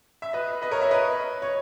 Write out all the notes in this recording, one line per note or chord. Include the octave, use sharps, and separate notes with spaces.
E5
B4 D#5
B4 D#5
A#4 C#5
C#5 E5
B4 D#5
C#5